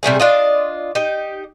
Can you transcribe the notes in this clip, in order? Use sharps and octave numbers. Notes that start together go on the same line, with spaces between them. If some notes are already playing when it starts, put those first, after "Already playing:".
C3 G3 A3 G#4
D4 F4 D#5
D#4 G4